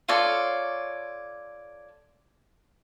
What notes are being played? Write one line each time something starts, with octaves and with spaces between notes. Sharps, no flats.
F4 A4 C#5 D5